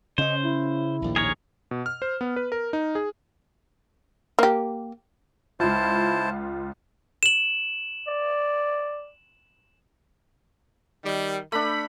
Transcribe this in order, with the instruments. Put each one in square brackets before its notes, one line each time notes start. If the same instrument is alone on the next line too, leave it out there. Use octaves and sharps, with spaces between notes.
[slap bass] C#3 C#4 [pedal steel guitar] C5 [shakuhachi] D#5
[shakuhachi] E4
[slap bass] A#1 D#2 A2
[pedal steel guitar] G#4 A#4 C#5
[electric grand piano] B2
F6
C5
B3
B4
A#4
D#4
G#4
[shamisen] A#3 G4
[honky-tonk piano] C#2 F4 [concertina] E4 C5 A5
[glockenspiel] E7 F#7
[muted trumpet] D5
[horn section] D#3 G3
[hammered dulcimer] A3 D4 [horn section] B5